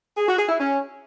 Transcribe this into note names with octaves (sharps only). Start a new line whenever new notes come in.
G#4
F#4
G#4
E4
C#4